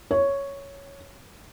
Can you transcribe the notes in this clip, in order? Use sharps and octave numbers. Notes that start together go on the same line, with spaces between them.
C#5